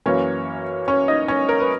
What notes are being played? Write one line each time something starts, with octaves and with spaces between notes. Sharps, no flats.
F#2 E3 A#3 C#4 C#5
C#4 C#5
D#4 D#5
C#4 C#5
A#4
B4